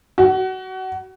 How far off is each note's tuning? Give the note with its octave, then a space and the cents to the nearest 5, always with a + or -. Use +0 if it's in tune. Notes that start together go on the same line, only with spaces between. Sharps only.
F#4 +30